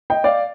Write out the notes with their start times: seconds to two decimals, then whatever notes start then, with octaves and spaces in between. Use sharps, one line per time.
0.10 D#5 G5
0.24 D5 F5